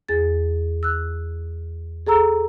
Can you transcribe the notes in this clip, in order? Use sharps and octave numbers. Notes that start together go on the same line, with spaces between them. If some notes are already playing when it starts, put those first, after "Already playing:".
E2 G#4 A6
E6 F#6
G#4 A4 A#5 E6